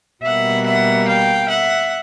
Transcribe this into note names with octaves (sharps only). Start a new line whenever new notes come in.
B2 G3 A#3 E5 F#5
E5 F#5
F5 G5
E5 F#5